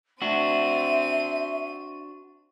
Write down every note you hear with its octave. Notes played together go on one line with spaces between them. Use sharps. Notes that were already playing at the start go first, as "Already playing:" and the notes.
C4 D4 F#4 E5 D#7